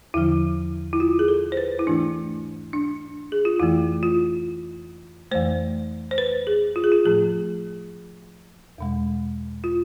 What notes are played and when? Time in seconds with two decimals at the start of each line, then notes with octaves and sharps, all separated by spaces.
0.14 E2 D3 F3 E4
0.93 E4
1.00 F4
1.19 G#4
1.28 A4
1.52 C5
1.57 B4
1.79 E4
1.87 G#2 E3 A3 D4
2.73 D4
3.32 G#4
3.45 F4
3.60 F2 E3 A3 E4
4.03 F4
5.31 F2 E3 A3 C5
6.11 C5
6.18 B4
6.47 G#4
6.76 F4
6.84 G#4
6.92 F4
7.05 A2 F3 A3 G#4
8.78 E2 B2 G#3
9.64 F4